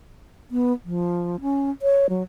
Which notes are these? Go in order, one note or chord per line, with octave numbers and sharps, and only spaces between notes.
B3
F3
C#4
C#5
F#3